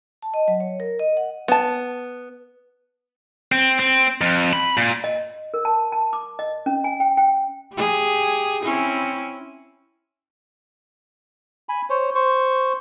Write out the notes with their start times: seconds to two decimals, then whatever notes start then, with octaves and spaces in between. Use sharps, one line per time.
0.22 A5
0.34 D#5
0.48 F#3
0.60 C#5
0.80 A#4
0.99 D#5
1.17 F#5
1.48 B3 A5
3.52 C4
3.80 C4
4.21 F2
4.53 B5
4.77 A#2
5.04 D#5
5.54 A#4
5.65 A5
5.92 A5
6.13 D6
6.39 D#5
6.66 C#4
6.84 G#5
7.00 G5
7.17 G5
7.74 G4 G#4
8.63 C4 C#4 E4
11.69 G#5 B5
11.90 C5 C#5
12.15 C5 C#6